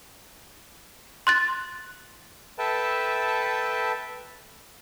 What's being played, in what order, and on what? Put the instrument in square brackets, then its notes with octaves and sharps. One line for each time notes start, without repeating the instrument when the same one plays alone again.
[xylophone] C6 F#6 A6
[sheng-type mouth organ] A4 B4 E5 G5 A5